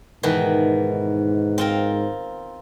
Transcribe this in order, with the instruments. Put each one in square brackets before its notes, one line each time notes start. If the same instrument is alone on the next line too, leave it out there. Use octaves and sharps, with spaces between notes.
[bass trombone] G#2 [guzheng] B2 D#3 E3
[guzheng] C4 F4 A#4